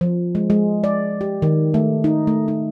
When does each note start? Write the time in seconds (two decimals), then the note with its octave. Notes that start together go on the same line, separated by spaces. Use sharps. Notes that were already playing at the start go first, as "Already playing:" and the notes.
0.01 F3
0.35 G#3
0.50 G#3
0.84 D5
1.21 G4
1.42 D#3
1.74 A3
2.04 D#4
2.27 A3
2.48 D#4